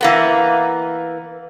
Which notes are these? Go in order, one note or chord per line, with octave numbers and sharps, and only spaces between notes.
E3 A#3 B3